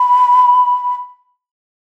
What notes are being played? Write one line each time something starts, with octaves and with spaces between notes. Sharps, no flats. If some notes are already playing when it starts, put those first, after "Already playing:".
Already playing: B5